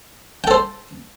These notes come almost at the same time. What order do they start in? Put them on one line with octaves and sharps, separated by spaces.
G5 A4 C5